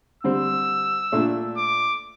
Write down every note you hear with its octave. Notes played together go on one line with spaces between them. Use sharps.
D3 G3 C4 E6
A#2 A3 D4
D6